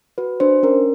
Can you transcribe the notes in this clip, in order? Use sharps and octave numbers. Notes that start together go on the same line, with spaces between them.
F#4 B4
D4 C5
C#4 A#4